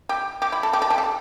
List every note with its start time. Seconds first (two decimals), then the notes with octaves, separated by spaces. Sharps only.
0.09 G4
0.42 G4
0.52 E4
0.63 A4
0.73 G4
0.82 A4
0.90 G4
0.98 A4